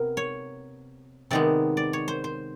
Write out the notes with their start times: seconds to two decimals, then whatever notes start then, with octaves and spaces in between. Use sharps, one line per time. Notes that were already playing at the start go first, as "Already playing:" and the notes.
Already playing: C3 B3 A#4
0.17 C#5
1.31 C3 D#3 G#3 B3 D5
1.77 D5
1.93 C#5
2.08 C5
2.24 C5